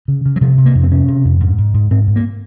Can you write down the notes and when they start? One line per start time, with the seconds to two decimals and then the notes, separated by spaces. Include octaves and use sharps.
0.08 C#3
0.26 C#3
0.36 F#3
0.41 C3 F3
0.58 C3
0.66 A#3
0.75 F2
0.83 C4
0.92 C3 C#4
1.08 C3
1.25 F2
1.40 G#2
1.58 G#2
1.74 G#2
1.91 G#2 C4
2.07 G#2
2.16 A#3